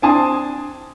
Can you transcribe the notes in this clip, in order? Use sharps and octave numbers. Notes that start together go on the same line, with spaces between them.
C4 D4 G#5 A5 C6 D#6